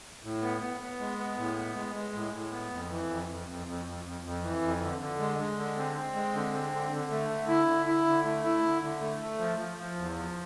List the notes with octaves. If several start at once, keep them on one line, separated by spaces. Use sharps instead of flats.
A2
B3
B3
B3
G#3
B3
A2
B3
G#3
G#3
A2
A2
B3
F2
E3
F2
F2
F2
F2
F2
F2
F2
E3
F2
D3
D3
G#3
G#3
D3
C4
C4
G#3
D3
C4
D3
D3
A3
D3
E4
D3
E4
D3
A3
E4
D3
D3
A3
A3
F3
F3
F3
E2
F3